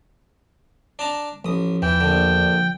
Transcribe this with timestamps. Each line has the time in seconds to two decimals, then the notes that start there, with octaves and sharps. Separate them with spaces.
0.99 D4 A5 A#5
1.45 A1 F3 D#6
1.82 E2 E3 G5
2.00 A#1 D3